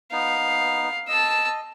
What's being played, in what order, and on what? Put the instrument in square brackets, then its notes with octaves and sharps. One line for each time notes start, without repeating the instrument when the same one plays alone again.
[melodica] B3 D#4 [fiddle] F5
[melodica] D#5 [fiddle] A5 E6